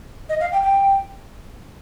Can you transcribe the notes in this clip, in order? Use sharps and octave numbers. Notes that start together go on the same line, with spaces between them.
D#5
F5
G5
G5